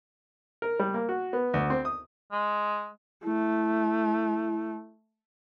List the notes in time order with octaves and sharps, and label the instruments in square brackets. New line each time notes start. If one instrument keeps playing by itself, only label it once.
[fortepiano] A#4
G3
A#3
F#4
B3
D2
C4
D#6
[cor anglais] G#3
[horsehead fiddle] A3 [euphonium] E4